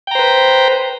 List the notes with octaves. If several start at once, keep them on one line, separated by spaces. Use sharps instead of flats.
B4 C5 G5 A#5